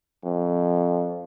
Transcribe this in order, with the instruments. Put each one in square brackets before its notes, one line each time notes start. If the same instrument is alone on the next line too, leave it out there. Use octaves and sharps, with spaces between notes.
[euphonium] F2